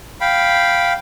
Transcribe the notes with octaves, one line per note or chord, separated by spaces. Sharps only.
F5 G5 B5